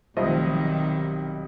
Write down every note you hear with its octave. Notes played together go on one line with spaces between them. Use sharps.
B1 C3 D#3 F3 G3 A3 D#5